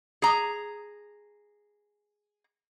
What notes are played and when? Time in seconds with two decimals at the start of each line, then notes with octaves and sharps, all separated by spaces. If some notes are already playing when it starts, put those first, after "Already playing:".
0.22 G#4 A#5